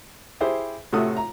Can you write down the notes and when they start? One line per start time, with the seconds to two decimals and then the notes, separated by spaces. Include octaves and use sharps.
0.41 E4 G4 G#4 C5
0.93 A2 C3 F#4 A4 D#6
1.17 A#5